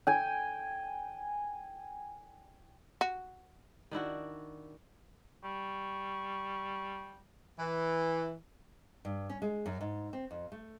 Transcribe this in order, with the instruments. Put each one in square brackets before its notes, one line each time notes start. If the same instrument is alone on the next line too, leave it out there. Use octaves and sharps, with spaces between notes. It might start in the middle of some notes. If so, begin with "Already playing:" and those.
[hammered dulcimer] G5 G#5
[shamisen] F#4
[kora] D#3 D4 E4 F#4
[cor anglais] G3 [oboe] C#6
[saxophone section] E3
[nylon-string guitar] G2
C#4
G#3
F#2
G#2
C4
F2
A3